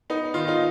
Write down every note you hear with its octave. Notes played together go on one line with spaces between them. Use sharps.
B3 D#4
D#3 F4
D#4